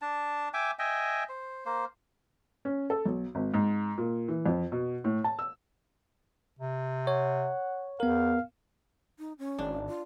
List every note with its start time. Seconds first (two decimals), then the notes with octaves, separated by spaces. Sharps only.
0.02 D4 A5
0.54 E5 G5 G#5 D6
0.79 D#5 E5 G5 G#5
1.29 C5
1.66 A#3 C5
2.65 C#4
2.90 A4
3.06 B1
3.35 G#1
3.54 G#2
3.98 A#2
4.28 E3
4.46 F2
4.72 B2
5.04 A2
5.24 A5
5.39 E6
6.59 C3
7.07 C#5 F#5
8.00 E2 B3 A#4 F5
9.19 D#4
9.39 C#4
9.59 G#1 D4
9.88 F4